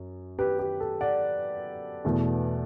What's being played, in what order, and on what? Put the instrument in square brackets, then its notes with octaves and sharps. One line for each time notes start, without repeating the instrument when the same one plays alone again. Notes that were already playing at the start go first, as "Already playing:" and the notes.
Already playing: [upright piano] F#2
G4 B4
G4
A4
D5 F#5
E2 B2 A3